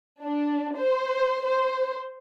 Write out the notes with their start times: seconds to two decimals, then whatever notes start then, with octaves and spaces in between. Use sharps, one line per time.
0.23 D4
0.77 C5
1.45 C5